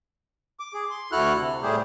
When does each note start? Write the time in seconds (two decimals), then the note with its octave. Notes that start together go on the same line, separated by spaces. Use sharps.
0.60 D6
0.74 G#4
0.90 C6
1.12 D2 E4 F#4 A4 F6 F#6
1.36 C3
1.63 A2 G3 A3 G4 G#4 C5